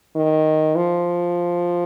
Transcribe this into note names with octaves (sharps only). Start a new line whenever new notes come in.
D#3
F3